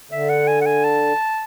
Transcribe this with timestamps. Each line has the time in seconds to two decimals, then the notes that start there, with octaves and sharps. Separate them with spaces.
0.11 D3 E5
0.29 F#5
0.47 G#5
0.61 F#5
0.66 G#5
0.84 A5